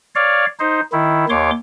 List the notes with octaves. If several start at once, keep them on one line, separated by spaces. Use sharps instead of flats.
C#5 D5 F5
D#4 C5
D#3 E4
D#2 C#5 C6 D6